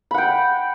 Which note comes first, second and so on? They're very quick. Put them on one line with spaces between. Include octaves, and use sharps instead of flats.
B5 F#5 G5